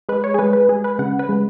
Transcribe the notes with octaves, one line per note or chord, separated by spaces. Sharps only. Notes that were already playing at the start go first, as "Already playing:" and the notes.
G#3 B4
C#5
G#4
G#3 B4
B4
G#3 G#4
B4
C#3 F#5
B4
G#3